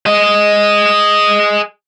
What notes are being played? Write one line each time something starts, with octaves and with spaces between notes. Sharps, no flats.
G#4 D#5